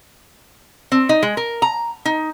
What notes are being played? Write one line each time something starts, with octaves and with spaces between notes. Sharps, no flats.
C4
D#4
G#3
A#4
A#5
D#4